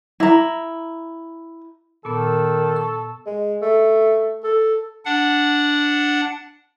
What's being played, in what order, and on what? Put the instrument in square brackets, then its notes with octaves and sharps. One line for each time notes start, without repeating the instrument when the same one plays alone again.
[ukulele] E4 A#5
[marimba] A#2 B3 [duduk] D#3 [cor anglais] A4
[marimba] C#6
[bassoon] G#3
A3
A4
[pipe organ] D4 F#5